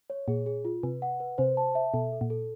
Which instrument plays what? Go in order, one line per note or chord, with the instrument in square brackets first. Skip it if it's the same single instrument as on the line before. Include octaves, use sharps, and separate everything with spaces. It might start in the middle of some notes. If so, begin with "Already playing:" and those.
[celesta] C#5
[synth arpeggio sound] A#2 [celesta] G#4
[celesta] G#4
F4
[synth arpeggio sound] C3 [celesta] B4
[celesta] F#5
B4
[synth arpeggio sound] C3 [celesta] C5
[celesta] A5
E5
[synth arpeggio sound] B2 [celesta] A4
[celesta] A4
[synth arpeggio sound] A#2
[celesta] A4